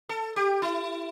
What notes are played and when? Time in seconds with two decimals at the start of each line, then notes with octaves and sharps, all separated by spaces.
0.09 A4
0.36 G4
0.62 E4